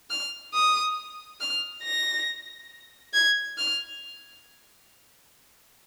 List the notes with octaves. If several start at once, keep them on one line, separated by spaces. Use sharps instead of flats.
F6
D#6
F6
A#6
G#6
F6